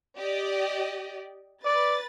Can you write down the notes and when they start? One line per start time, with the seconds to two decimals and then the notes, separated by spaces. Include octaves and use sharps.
0.19 G4 D5 D#5
1.65 B4 D5 A6